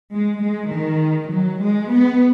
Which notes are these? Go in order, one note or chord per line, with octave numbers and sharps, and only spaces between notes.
G#3
G#3
D#3
F#3
G#3
B3